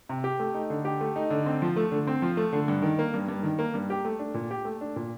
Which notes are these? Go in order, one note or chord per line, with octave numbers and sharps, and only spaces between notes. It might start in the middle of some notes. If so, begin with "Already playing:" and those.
C3
G4
A3
D#4
D3
G4
A3
D#4
D3
C4
F3
A3
D3
C4
F3
A3
D3
G2
D#3
A#3
G2
G2
D#3
A#3
G2
G4
A3
D4
A#2
G4
A3
D4
A#2